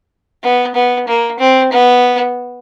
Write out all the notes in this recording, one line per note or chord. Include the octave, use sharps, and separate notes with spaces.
B3
B3
A#3
C4
B3